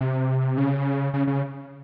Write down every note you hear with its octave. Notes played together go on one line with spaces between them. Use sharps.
C3
C#3
C#3
C#3